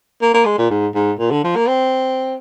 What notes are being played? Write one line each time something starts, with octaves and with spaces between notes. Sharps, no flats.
A#3
A#3
G#3
A#2
G#2
G#2
A#2
D3
F3
A#3
C4